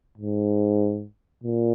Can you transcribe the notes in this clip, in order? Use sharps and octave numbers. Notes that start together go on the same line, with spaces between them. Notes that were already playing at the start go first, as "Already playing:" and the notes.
G#2
A#2